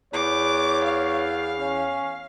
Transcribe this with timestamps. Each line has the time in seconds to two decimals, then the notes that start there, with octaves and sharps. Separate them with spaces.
0.13 E2 C#5 D6
0.85 F5
1.59 C#4